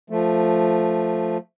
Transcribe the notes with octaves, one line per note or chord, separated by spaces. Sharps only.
F3 A3